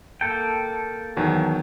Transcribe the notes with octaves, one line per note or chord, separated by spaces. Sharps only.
A#3 A4 G5
E2 D#3 F#3